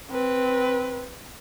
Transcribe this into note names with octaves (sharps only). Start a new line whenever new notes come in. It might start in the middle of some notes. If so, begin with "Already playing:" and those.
C4 B4